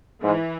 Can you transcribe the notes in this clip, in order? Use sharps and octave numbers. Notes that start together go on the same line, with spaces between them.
G#2 E3